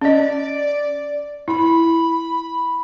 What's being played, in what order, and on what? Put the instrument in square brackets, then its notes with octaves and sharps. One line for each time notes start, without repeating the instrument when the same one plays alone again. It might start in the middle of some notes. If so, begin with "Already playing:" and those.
[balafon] C#4 D#5 [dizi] D5
[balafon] E4 [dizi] B5